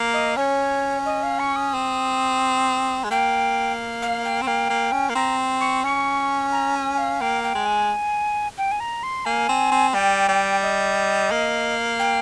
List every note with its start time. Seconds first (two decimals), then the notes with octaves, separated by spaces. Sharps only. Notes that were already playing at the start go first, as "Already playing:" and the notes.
Already playing: A#3
0.14 D#5
0.37 C#4 C#5
1.06 D#5
1.23 F5
1.39 C#6
1.56 D#6
1.74 C4
3.04 G#3
3.11 A#3 G5
4.02 F5
4.25 G5
4.42 C4
4.47 A#3
4.70 A#3
4.92 C#4
5.10 A#3
5.15 C4 A#5
5.61 C#6
5.84 C#4 C#6
6.52 A#5
6.76 G#5
6.98 F5
7.21 A#3 G5
7.44 G5
7.55 G#3
7.66 G#5
8.58 G5
8.72 G#5
8.80 A#5
9.03 C6
9.25 A#3 G#5
9.49 C4
9.72 C4
9.94 G3 G5
10.29 G3
10.63 D#5
11.31 A#3
11.99 G5